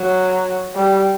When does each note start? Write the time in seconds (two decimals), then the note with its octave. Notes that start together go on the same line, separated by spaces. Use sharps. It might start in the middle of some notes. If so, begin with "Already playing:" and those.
Already playing: F#3
0.75 G3